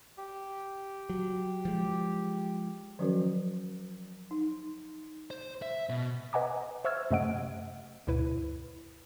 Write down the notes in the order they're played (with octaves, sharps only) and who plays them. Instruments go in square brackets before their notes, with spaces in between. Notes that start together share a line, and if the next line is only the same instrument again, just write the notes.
[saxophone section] G4
[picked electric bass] F#3
F3 G#3
[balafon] D#3 F3 F#3 C#4 F#4 A#4
D#4
[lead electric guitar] C5
E5
B2
[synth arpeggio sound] B4 D#5 F#5 G#5 A#5 D6
C5 E5 C#6 E6 F6 G#6
F#2 C3 A3 D#5 F#5 D7
D2 G2 B2 E4 B4 D#7